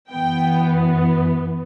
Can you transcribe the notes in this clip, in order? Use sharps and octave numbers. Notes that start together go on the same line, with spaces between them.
F#2 E3 B3 G5